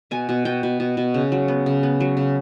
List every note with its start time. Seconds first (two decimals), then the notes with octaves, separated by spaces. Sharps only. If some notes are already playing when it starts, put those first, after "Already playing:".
0.11 B2 G#5
0.29 B2
0.45 B2 G5
0.63 B2
0.80 B2
0.97 B2
1.14 C#3
1.32 F#3
1.48 B3
1.66 C#3
1.83 B3
2.00 F#3
2.17 C#3